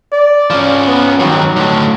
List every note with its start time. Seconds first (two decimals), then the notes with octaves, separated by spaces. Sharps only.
0.13 D5
0.50 F3 C#4
0.87 B3
1.20 G2 D#3 F#3
1.57 A2 D3